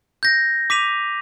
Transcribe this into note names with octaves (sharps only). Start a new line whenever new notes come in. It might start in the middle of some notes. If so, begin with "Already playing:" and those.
G6 A#6
D6 B6 D#7 F7